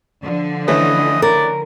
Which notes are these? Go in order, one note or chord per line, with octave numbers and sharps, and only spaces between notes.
D3 F3
E3 A3 C#4 D#5
A#4 D5